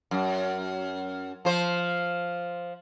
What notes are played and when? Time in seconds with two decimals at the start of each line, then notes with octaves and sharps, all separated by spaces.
0.11 F#2
1.45 F3 C5